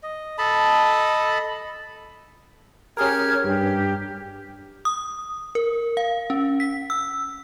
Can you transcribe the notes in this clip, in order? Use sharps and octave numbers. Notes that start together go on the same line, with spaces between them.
D#5
A4 D#5 A5 B5
C#4 G4 G#4 A#4 F6 G#6
G2 G4
D#6
A#4
F5
C#4
B6
E6